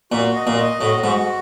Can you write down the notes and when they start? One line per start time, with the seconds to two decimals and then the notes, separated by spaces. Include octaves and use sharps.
0.11 A#2 F#4
0.36 D#5
0.47 A#2
0.58 D#5
0.81 A2 F#4
1.04 G#2 F#4